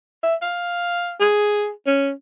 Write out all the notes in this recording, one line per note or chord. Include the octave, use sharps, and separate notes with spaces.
E5
F5
G#4
C#4